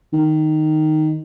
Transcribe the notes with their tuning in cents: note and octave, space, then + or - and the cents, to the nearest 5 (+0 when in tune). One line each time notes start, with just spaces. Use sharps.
D#3 -5